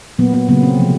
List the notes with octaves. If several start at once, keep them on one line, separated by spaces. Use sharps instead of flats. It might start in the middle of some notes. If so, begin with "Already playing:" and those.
A#2 F#3 A#3 B3
B3
C#3 F#3 A#3 B3
C4
C3 F3 A3